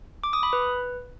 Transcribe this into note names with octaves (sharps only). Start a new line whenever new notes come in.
D6
D#6
B5
B4